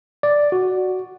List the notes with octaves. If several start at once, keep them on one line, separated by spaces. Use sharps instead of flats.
D5
F#4